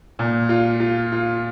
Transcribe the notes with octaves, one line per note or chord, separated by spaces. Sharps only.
A#2
F4
F4
F4